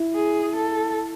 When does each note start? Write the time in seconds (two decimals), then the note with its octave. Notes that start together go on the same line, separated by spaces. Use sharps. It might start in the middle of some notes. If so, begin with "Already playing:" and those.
Already playing: E4
0.15 G#4
0.56 A4